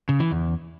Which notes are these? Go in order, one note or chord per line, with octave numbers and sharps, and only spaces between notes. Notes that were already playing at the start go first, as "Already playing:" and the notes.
C#3
E3
E2